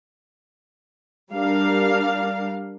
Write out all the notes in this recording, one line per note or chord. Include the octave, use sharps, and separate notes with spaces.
G3 D4 A#4 F5